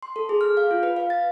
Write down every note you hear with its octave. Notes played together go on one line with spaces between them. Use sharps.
C6
A4
G#4
F6
F5
F4
B4
F5
A6